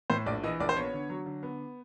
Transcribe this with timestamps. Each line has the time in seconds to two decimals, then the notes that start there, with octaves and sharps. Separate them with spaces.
0.10 A2 C5
0.26 A#1 D5
0.43 E3 D#5
0.60 A#1 D5
0.69 C5
0.76 B3 C#5
0.93 D3
1.10 F#3
1.26 D3
1.43 B3